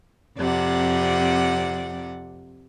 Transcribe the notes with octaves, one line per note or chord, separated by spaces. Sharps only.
F2 C3 D5 F#5